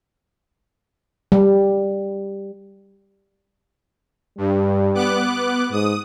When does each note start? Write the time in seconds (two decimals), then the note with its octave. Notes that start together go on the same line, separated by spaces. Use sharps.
1.32 G3
4.38 G2 G3
4.94 B3 D6 F#6
5.72 G#2 D#6